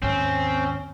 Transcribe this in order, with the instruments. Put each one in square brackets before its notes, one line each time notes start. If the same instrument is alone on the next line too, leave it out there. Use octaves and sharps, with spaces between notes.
[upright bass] D#2 G#2 [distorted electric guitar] C4 [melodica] C#4